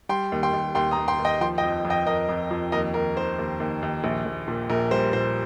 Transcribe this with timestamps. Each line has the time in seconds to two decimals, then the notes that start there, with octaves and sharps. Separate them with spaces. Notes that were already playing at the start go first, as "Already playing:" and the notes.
0.09 G3 G5 C6
0.32 D#2
0.43 G5 C6
0.53 D#2
0.75 D#2 G5 C6
0.91 A#5 D#6
0.97 D#2
1.08 G5 C6
1.19 D#2
1.25 D#5 G5
1.41 F3 G5 C6
1.58 D#5 G5
1.63 F2
1.85 F2
1.90 D#5 G5
2.07 F2 A#4 D#5
2.29 F2
2.51 F2
2.72 D#2 A#4 D#5
2.94 D#2 A#4
3.16 D#3 C5
3.38 D#2
3.60 D#2
3.83 D#2
4.04 A#1
4.26 A#1
4.48 A#2
4.70 A#1 A#4
4.91 G3 C5
5.13 A#2 C5